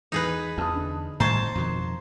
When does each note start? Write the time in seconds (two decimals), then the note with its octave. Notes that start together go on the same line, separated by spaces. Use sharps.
0.12 E2 D#4 G#4 B4
0.58 E2 A5 D#6
0.75 D3
1.20 A2 D#3 G3 C5 A5 A#5 C#6 G#6
1.55 F2 B2 D#3